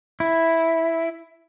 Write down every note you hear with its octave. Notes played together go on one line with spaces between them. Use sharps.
E4